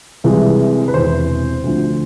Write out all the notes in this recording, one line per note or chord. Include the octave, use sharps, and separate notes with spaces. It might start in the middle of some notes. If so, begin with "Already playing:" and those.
C2 C3 E3 G#3
B4
E1 E2 C3 C5
D2 D3 F3 A3